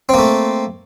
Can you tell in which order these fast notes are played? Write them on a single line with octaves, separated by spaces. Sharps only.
C4 A#3 A3